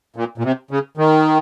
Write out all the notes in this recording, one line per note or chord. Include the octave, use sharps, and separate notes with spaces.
A#2
A#2
C3
C#3
D#3